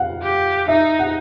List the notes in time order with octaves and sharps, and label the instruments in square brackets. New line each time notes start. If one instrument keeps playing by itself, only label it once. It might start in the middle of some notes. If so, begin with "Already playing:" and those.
Already playing: [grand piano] F5 F#5
[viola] G4
[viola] D#4 [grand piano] E5
[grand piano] F#5